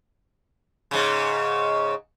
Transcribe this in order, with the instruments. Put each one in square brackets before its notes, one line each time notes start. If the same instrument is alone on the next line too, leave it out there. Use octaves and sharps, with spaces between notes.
[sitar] G#2 C#3